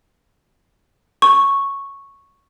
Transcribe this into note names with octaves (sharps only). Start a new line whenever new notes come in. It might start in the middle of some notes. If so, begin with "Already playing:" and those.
C#6